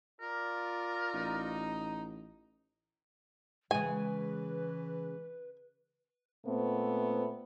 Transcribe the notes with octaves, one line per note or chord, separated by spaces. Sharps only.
F4 A#4 D5
A1 D#4
C#3 E3 G#3 B4 G#5
A#2 A3 B3 C4